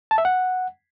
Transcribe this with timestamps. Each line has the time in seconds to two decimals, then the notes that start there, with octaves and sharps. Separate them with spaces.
0.11 A5
0.18 E5
0.25 F#5